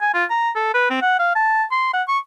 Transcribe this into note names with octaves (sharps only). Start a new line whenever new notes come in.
G#5
F4
A#5
A4
B4
C4
F#5
F5
A5
C6
F#5
C#6